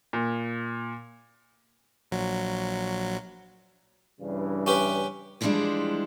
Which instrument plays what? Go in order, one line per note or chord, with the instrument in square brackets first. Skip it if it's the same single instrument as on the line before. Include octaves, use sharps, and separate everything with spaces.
[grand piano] A#2
[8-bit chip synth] A#1 F#3
[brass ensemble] G2 C#3 E3
[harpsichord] C#4 G4 B4
[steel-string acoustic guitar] E3 F3 G3 G#3 D4 E4